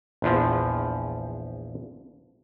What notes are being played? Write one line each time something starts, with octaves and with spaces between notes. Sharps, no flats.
A#1 E2 F3